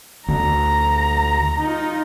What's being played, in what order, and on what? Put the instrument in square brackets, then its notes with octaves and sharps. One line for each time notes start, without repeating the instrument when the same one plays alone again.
[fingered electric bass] D2 [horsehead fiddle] A#5
[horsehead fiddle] D#4 F4